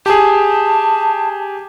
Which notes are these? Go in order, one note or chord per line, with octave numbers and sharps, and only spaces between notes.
G4 G#4 A5